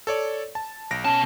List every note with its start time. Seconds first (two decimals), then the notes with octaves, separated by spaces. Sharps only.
0.07 A4 C#5 D5
0.55 A5
0.91 B1 A#6 D7
1.05 B2 C#4 A5